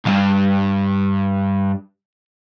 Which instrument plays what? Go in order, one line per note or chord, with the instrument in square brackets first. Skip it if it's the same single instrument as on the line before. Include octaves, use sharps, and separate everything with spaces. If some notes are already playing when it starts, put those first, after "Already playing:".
[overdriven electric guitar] C2 G2